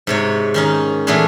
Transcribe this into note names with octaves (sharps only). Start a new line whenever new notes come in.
G#2 C3 C#5
D#3 C#4 D#4
A#2 E3 A3 B3 D4 G#4